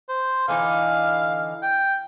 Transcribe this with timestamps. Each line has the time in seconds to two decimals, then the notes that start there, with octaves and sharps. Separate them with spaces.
0.09 C5
0.48 D3 E3 D#4 F5
1.62 G5